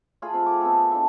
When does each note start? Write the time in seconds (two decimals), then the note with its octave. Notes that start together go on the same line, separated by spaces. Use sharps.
0.22 A3 F4 G#4 B5
0.34 C4
0.46 D6
0.61 B3 C4 G#4 A4
0.74 G4
0.91 D4 E4